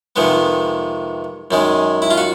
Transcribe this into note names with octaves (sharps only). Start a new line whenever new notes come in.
F2 C3 D#3 G#3 B3
F#2 D#3 G#3
E4
F4
F#4